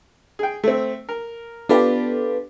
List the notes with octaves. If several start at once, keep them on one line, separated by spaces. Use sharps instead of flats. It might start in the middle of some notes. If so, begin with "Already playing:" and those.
G#4 G5
A3 C4
A#4
B3 D4 F4 G4 A4 B4